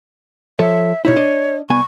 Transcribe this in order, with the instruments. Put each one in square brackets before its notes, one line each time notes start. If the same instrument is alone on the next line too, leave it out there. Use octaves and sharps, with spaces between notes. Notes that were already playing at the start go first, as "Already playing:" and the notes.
[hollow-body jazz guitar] F3 A4 C#5 [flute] E5
[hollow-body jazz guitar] B2 D#4 E4 [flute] C#5
[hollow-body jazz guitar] D4 D#5
[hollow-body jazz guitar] C2 B3 G#5 [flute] C#6